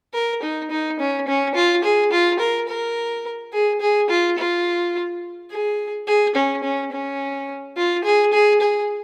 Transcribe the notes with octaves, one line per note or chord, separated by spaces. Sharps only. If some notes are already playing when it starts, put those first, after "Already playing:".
A#4
D#4
D#4
C#4
C#4
F4
G#4
F4
A#4
A#4
G#4
G#4
F4
F4
G#4
G#4
C#4
C#4
C#4
F4
G#4
G#4
G#4